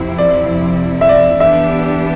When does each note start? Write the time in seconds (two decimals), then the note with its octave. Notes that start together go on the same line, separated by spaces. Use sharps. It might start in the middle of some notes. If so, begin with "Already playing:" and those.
Already playing: F2 C3 F3 C4 E4
0.18 D5
1.01 E5
1.09 D5
1.40 E3 B3 D4 G4 E5